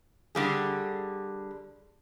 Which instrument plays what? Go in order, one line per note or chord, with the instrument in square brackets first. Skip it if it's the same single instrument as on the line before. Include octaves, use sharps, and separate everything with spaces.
[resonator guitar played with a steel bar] D3 G3 G#4